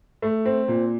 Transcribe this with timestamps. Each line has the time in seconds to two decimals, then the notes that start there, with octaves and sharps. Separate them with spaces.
0.22 A3
0.45 C4
0.68 A#2